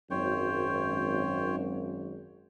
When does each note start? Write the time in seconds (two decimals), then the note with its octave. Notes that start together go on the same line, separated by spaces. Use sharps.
0.11 G#1 F#2 C5 C#5 G5